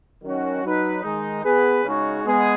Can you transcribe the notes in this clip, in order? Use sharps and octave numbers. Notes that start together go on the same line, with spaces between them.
D#3 F#3 C#4 F#4
F#3 D#4 B4
D#3 G#3 D#4
B3 G#4 B4
C#3 G#3 D#4 F#4 C#5
G#3 B3 G#4